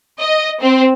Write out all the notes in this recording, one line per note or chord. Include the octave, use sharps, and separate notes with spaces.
D#5
C4